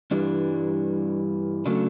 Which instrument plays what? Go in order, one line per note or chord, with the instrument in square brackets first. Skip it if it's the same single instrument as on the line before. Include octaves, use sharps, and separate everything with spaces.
[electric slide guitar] G2 E3 G3 D4
C#3 F#3 A3 D4